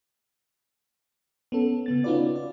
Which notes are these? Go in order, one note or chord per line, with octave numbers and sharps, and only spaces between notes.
B3 C#4 A4
C#3 B3 A6
C#4 D#4 F4 F#4 B4 D5
D5